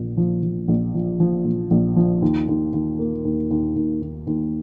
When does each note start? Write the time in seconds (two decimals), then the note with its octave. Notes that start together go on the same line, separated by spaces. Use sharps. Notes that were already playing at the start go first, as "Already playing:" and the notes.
Already playing: A#1 A#2 F3
0.17 F3
0.43 F3
0.68 A#1
0.94 F3
1.20 F3
1.45 A#1
1.71 A#1
1.96 F3
2.22 D#2
2.48 D#2
2.73 D#2
2.99 A#3
3.25 D#2
3.50 D#2
3.76 D#2
4.02 D#2
4.27 D#2